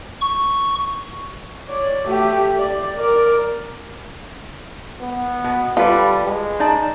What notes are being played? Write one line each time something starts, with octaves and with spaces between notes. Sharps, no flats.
C#6
C#5 D5
A3 G4
D5
A#4 D5
B3
B2
G3 F4 A4 B4
G#3
D#4 D5 A5